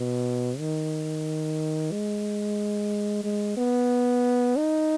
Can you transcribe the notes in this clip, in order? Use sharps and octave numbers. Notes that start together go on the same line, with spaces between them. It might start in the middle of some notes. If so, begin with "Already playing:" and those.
Already playing: B2
D#3
G#3
G#3
B3
D#4